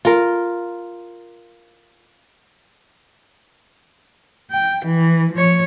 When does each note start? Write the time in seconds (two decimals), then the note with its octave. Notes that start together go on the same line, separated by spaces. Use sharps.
0.05 F4 A#4
4.51 G5
4.86 E3
5.33 F3 C#5